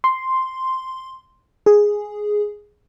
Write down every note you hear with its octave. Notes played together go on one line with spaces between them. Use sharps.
C6
G#4